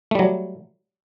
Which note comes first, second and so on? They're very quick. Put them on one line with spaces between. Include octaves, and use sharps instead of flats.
A3 G3 F#3